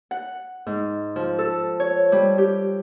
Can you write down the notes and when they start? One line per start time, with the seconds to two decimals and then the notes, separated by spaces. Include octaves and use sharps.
0.11 F#5
0.66 G#2
1.16 F3
1.39 A4
1.80 C#5
2.12 G3
2.38 G4